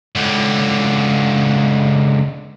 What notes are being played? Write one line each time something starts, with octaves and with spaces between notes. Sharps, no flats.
C#2 D3